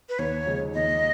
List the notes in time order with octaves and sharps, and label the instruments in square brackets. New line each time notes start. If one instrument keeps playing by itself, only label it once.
[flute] B4
[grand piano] D#2 [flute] C#5
[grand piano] C#3 F3 G#3
[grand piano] D#2 [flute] D#5